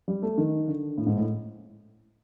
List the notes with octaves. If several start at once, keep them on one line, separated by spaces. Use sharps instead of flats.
G3
A3
D#3
D3
A2
G#2
A2